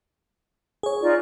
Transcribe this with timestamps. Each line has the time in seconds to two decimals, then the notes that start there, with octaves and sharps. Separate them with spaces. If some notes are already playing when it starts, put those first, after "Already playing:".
0.83 G#4 C#5
1.01 D#4 F4 D5